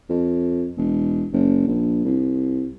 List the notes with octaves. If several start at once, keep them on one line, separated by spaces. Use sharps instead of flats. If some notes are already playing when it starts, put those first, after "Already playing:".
F2
E1
F#1
A#1
C2